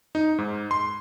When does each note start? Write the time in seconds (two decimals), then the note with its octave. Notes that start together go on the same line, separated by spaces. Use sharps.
0.15 D#4
0.38 G#2
0.71 C6